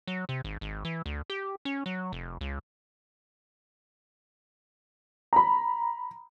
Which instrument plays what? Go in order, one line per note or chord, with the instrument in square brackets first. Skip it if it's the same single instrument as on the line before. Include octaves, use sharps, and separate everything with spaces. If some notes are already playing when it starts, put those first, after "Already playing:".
[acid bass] F#3
C3
G#1
G#1
E3
D2
G4
C#4
F#3
F1
C#2
[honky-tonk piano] A#5 B5